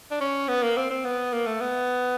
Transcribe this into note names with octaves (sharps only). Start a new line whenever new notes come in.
D4
C#4
B3
A#3
C4
C4
B3
A#3
A3
B3